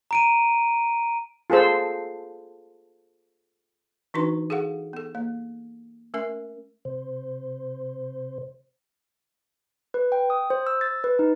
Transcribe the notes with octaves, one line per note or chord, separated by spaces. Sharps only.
A#5 D7 D#7
F4 G#4 A4 C5 E6
E3 D4 D#4 F#4 B4 C6
G#4 A4 F5 F#5
B3 A4
A#3
A3 C#4 A#4 E5
C3 C5
B4
G5
D#6
C5
E6
A6
B4
D#4